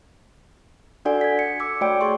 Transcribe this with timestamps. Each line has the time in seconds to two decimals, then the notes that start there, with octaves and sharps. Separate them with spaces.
1.05 D4 F#4 A4 D5 F#5 G#5
1.21 G#6 B6
1.39 C#7
1.60 D6 E6 C#7
1.81 A3 F#4 C#5 D5 G5 D7
2.01 G#4 C6 C#6